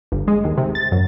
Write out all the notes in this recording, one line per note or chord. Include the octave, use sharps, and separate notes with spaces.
G1
G#3
D#2
C3
A6
F#2